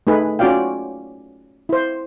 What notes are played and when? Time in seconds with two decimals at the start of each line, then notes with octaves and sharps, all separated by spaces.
0.07 A3 D#4 G#4 B4
0.39 C#4 F4 F#4 D5 F5 G5
1.69 E4 C5